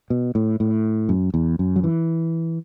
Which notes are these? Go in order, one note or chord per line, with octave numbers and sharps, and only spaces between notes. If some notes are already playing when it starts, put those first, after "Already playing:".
B2
A2
A2
F#2
E2
F#2
F#3
E3